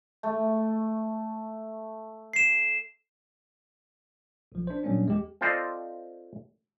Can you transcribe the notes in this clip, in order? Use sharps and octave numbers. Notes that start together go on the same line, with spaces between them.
A3
C7 E7
B1 F3
D4 C5
A#2 F#3 G3 A#3 C#4 D4
E2 G#3 G4
C4 F4 A4 C5 D5 D#5